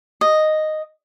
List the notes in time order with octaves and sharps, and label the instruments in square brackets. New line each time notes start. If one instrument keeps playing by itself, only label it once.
[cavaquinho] D#5